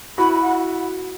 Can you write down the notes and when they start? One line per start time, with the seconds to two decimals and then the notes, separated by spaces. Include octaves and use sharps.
0.18 E4 F#4 B5
0.33 B5
0.42 F#5